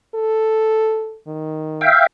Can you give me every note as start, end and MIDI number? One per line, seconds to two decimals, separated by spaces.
0.15 1.18 69
1.27 1.88 51
1.81 2.07 76
1.81 2.07 77
1.81 2.07 79